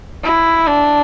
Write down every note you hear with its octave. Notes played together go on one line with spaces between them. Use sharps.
E4
D4